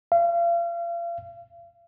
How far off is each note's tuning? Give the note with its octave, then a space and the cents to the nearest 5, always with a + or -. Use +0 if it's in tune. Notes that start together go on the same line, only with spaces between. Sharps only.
F5 -35